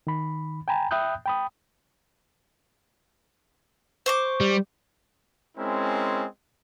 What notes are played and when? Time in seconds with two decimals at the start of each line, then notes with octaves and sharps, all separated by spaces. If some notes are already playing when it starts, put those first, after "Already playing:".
0.07 D#3 B5
0.68 G5 G#5 A#5 B5
0.91 E5 G5 B5 D#6 F#6 G6
1.26 G5 B5 D#6
4.06 C5 C#6 D6
4.41 G3
5.58 G#3 C4 C#4 E4 A#4